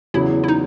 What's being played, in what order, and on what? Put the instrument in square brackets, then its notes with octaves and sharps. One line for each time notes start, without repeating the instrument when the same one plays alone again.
[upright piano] E2 C#3 F#3 C#4 [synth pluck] E4
[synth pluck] E4
D#4